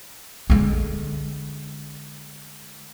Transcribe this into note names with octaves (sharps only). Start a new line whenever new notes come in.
D3 G#3